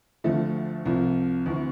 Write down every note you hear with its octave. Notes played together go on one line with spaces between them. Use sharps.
D2 D3 F3 A3
C2 C3 F3
D2 C3 E3